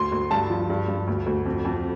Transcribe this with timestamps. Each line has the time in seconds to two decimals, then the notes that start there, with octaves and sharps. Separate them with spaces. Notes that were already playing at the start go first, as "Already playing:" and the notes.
Already playing: D2 C6
0.12 D2
0.31 G2 A5
0.50 F3
0.70 G2
0.88 G2
1.07 D2
1.26 D2
1.46 F2
1.65 F2